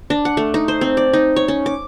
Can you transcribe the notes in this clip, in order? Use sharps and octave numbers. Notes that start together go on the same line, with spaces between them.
D4
F#5
A3
D#4
C5
C4
D5
D#4
C#5
C#4
D6